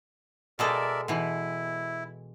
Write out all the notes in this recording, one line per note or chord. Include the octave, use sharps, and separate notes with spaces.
B2 G#3 A4 A#4 D5 E5
B2 E3 E4